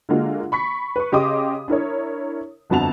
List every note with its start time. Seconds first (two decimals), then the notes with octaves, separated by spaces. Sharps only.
0.09 D3 G#3 A#3 F4 F#4
0.52 B5 C#6 B6
0.96 B4 C#6
1.12 C#3 G4 D#5 C6 D6 D#6
1.68 D4 E4 A#4 C#5
2.70 G1 F2 F#4 A5 F7